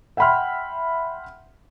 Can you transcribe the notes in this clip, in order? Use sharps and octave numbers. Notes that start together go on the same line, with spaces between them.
E5 F#5 G5 B5 C6 F6